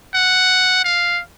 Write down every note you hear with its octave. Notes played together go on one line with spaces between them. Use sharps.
F#5
F5